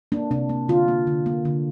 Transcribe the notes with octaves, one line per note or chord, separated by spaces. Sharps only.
A#3 D4
C3 D4
A#3
D3 F4
A#3
D3
A#3
D3